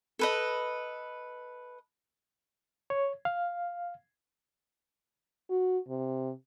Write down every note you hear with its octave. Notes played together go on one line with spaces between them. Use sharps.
A4 B4 D#5
C#5
F5
F#4
C3